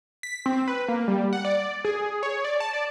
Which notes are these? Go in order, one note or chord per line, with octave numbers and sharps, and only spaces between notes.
B6
C4
B4
A#3
G3
F#5
D5
G#4
C#5
D5
A5
D5